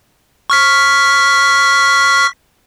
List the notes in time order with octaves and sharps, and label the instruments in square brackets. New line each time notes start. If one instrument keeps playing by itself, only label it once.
[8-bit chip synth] C#6 F6 B6